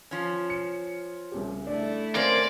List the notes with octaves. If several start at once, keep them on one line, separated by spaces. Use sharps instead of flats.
F3 C#4
C#7
C2 C#3 G4
A3 D4 E4
A#3 C4 C#4 C5 D5